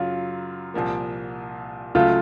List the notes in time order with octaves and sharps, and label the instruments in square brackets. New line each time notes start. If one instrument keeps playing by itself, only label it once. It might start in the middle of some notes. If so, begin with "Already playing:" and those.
Already playing: [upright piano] F#2 C#3 F#3 [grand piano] F4
[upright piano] C2 A#2 F3 A#3
[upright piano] C#2 C#3 F#3 A3 [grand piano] F4